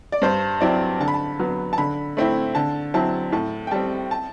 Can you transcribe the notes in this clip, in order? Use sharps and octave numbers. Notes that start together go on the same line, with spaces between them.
D5
G2 C5
F#3 C4 E4 D5
D3 A5
B5
A5
F#3 B3
A5
D3 B5
A3 C4 E4
D3 A5
F#3 C4 E4 A5
A2 A5
G5
G3 C4 A5
A5